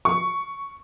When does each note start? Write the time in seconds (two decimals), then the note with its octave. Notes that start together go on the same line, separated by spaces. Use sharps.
0.05 C#6